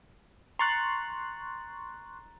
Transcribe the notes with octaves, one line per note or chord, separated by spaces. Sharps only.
A#5 C6 C#6 F#6 A6